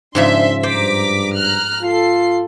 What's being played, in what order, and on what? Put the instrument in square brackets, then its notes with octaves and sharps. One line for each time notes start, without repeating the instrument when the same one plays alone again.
[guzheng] G#2 C#3 F3 [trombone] D4 [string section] E5 C6
[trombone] G2 [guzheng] C5 D5 [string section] A#5 D6 B6
[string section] A#5 F6 F#6
[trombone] F4 [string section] A4 C7